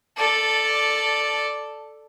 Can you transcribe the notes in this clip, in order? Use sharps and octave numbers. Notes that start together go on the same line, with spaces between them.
A4 D5